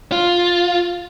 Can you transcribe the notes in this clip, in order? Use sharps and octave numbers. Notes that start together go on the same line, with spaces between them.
F4